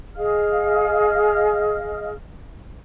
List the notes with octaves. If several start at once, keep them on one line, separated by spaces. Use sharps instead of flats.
G#4 D#5 F5 F6